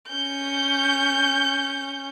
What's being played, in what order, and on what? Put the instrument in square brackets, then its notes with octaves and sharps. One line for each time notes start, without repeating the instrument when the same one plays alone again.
[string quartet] C#4 G6